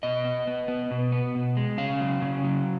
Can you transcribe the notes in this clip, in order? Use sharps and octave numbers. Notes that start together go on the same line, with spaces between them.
B2 D#5
B3
B3
B3
B2
B3
B2
G#3
C#3 F5
F#3
C#3
F#3